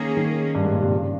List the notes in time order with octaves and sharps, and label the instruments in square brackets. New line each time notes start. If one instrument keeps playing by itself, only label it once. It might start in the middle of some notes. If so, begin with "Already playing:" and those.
Already playing: [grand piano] D#3 [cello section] A#3 C#4 G#4
[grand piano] D#3
G2
G#2
A#2
C3
C#3